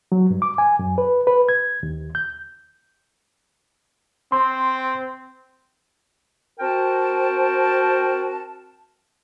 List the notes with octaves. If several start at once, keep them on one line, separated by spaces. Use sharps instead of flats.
F#3
G2
D6
G#5
F#2
B4
B4
G#6
D#2
G6
C4 C6
C4 F#4 A#4 G5 A5